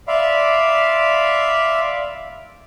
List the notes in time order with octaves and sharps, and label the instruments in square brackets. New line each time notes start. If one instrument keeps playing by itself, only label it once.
[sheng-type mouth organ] D5 E5 F5 B5 C6